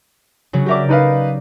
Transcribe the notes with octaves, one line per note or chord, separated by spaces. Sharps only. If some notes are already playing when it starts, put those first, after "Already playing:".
C#3 F#3 F#4
F#4 G4 A#4 D5 E5 D6
D#4 B4 F5